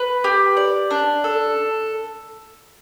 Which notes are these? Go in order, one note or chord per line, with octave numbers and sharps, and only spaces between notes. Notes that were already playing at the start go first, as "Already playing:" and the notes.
Already playing: B4
G4
D5
D4
A4